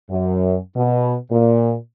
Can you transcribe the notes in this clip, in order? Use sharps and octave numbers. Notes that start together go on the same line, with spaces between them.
F#2
B2
A#2